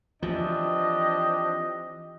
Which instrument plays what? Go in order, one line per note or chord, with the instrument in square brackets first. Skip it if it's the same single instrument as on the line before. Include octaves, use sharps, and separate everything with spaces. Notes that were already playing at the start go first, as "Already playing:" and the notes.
[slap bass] E3 F3 [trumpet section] C4 D4 G4 [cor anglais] D#5